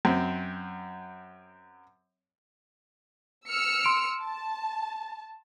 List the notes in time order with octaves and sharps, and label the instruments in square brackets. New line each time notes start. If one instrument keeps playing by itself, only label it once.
[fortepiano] F#2 C4
[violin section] E6 F6 C#7
[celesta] C6 D7
[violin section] A5